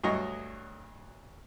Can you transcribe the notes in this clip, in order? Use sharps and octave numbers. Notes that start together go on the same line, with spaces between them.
D2 G2 F#3 C#5 D#5 C#6